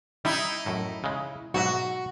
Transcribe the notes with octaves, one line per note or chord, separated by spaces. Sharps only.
G3 D#4 E4
F#2 A2
C#3 G#3
B1 G#2 F#4 E5